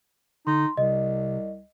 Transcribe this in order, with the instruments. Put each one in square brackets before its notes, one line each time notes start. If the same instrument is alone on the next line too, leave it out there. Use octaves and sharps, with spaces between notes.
[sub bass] D3 [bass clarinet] D#4 [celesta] C6
[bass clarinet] C2 [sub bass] C3 [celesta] D#5